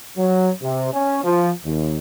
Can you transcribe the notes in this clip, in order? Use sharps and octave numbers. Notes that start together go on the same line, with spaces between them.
F#3
C3
C#4
F3
D#2